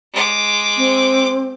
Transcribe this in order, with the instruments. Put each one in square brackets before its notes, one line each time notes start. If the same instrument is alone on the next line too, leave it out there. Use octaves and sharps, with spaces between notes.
[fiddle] G#3 D6
[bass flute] C4